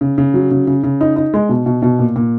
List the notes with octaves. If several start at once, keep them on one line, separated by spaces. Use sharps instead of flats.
C#3
C#3
F#3
C#3
C#3
C#3
D#4
D#4
G#3
B2
B2
B2
A#2
A#2